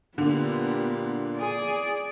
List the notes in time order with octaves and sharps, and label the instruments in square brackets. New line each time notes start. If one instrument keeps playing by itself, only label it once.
[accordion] A#2 A#3 [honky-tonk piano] D3 [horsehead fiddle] B3 G4
[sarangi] G#4 [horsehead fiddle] D5